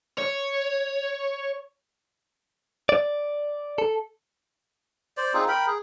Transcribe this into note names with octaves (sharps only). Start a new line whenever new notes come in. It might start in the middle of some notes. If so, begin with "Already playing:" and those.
C#5
D5
A4
C5 D5
C4 D#4 F4 G#4
A#4 G5 B5
G#4